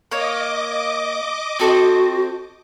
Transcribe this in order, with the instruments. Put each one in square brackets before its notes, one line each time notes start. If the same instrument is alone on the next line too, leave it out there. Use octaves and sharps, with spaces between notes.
[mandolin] A#3 C#5 [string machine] D#5 D6
[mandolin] C4 A4 C5 [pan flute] F#4